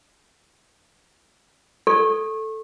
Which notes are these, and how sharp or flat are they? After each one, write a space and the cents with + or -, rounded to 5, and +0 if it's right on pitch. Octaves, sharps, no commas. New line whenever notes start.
A4 +0 C#6 -30